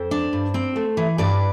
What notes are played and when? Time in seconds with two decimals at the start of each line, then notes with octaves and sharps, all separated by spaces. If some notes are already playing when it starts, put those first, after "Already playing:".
Already playing: F2 C5
0.11 D4
0.33 G2
0.54 C4
0.76 A3
0.97 E3
1.18 G2 B4 D5